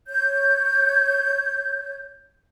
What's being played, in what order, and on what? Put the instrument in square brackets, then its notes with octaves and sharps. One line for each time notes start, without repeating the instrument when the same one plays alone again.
[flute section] C#5 G6